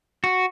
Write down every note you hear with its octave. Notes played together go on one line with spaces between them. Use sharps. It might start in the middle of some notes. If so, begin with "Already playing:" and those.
F#4